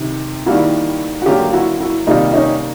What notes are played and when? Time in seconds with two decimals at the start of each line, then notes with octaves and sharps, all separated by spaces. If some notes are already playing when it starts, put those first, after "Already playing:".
Already playing: C3 D#3
0.46 D#3 G3 A#3 E4 F#4
1.22 F#4
1.26 D3 F#3 A#3 F4 G4
1.53 E4 F#4
1.80 E4 F#4
2.07 C3 D#3 G3 A#3 D#4 F4
2.33 C#4 D#4